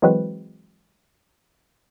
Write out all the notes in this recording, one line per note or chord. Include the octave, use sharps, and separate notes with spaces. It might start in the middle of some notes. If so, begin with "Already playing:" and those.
E3 F#3 G#3 C4 F#4 B4